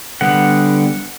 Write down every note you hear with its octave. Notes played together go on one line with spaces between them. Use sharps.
D3 G3 B3 F#5